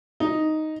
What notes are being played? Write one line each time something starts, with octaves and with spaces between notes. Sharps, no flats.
D#4